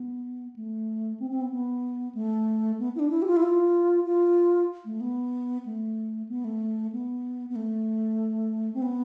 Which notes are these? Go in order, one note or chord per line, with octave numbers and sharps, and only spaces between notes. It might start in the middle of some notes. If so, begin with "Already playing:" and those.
Already playing: B3
A3
C4
C4
B3
B3
A3
B3
E4
D4
E4
G4
F4
E4
F4
F4
A3
B3
A3
B3
A3
B3
B3
A3
C4
B3